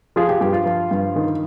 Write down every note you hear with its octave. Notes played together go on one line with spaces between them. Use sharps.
F3 F4 G#4
G4
G2 G4
F4
F3
G2
D#3